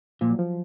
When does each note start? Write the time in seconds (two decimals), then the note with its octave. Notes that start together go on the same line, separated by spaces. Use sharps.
0.21 A#2 F3
0.30 F#3
0.39 F3